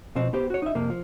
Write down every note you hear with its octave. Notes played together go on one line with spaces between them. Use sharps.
B2 F3 C4
B3 G4 C5
F#4 C#5
D#4 E5
F2 C3 A#3
F3